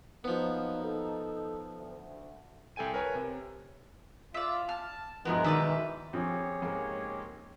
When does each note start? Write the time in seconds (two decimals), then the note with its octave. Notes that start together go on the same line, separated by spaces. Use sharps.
0.24 F3 F#3 A#3 B3 D#4
0.82 D#4 A4
1.77 D2
2.76 C2 A4 G5 G#5 D#7
2.94 A#4 B4 C#5 G#5
3.15 C3
4.34 F4 D5 E5
4.69 A5 F6
5.25 G2 B2 E3 F3 G#3 B3 A#4
5.44 D#3 B4 D5 E5
6.13 F2 C#4 G4 G#4 C#5
6.62 G#2 G#3 A#3